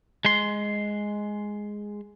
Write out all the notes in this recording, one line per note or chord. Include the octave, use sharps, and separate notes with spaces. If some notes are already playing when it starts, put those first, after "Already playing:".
G#3 C6